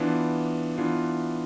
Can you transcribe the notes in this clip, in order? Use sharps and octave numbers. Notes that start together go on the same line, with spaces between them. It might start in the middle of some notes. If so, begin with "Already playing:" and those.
Already playing: E3 B3 D4 F4
E3 B3 D4 F4